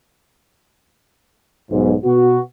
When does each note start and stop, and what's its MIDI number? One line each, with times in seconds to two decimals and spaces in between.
1.70 1.94 35
1.70 1.94 44
2.04 2.39 47
2.04 2.39 59
2.04 2.39 66